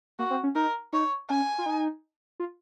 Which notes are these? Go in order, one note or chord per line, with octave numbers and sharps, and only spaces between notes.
A#3 F#4
C4
C#4
D#4 A#4
D#4 C#5
C#4 G#5
F4
D#4
F4